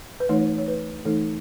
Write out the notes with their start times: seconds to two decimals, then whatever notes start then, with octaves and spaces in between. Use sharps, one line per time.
0.20 B4
0.29 E3 A3 D#4 C#5
0.58 C#5
0.68 B4
1.05 E3 A3 D#4 A4